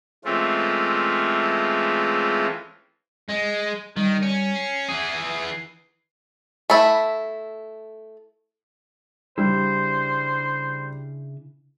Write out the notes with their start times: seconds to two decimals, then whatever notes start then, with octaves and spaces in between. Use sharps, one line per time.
0.25 E3 G#3 A3 C4 C#4 F4
3.30 G#3
3.97 D#3 G3
4.22 C#4
4.55 C7
4.89 E3 G#4
6.70 A3 E4
9.38 C#3 G3 D4 E4 C5